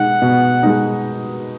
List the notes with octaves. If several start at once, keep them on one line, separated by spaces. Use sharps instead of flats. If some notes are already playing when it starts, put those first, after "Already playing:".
Already playing: B2 G#3 D#4 F#5
B2
G#3 D#4